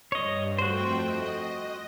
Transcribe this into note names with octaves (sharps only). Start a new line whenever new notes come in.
G2 C#5 D#5
F2 A3 F#4 C5 G5
D#5